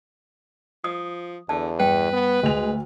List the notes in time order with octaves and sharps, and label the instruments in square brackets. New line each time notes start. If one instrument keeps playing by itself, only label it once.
[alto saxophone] F3 [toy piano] D#6
[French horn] E2 [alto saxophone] D3 [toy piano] A5
[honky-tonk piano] G2 [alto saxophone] B4 [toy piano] G5
[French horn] B3
[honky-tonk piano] D2 F7 [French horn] G#3